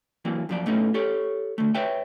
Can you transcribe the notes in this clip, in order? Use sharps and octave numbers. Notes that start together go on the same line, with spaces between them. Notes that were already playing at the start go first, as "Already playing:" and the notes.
E3 F#3 A#3 C4
F#2 F3 D5
A2 A3 B3 C#4 D#4
G4 A4 C#5
D3 A3
B4 C#5 E5 G5